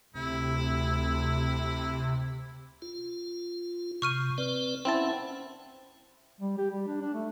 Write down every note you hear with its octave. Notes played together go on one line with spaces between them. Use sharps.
D2 C3 E4
F4
C3 C#6 F6 D#7
C4 B4 D5
C4 C#4 E4 F#5 A5
G3
G4
G3
D4
D4
A3